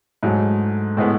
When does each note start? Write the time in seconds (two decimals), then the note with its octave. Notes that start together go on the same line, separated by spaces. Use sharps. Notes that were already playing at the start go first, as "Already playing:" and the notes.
0.23 G#2 F#3 A3
0.97 A2 G#3 B3